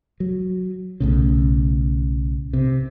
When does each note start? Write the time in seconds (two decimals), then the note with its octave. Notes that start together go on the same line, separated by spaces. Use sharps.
0.20 F#3
1.00 B1 A2 C#3
2.53 C3